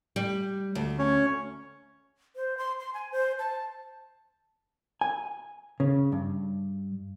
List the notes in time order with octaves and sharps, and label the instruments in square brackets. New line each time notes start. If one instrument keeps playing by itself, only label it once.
[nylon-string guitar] G3
D2
[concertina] C#4 C#5
[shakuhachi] C5
C6
C6
G#5
C5
A5
[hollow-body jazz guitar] G#5
C#3
G2